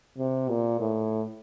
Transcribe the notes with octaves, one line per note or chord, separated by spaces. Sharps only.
C3
A#2
A2